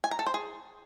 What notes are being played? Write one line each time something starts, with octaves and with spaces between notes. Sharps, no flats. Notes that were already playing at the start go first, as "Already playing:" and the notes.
G#5
A#5
A4
C5
G#4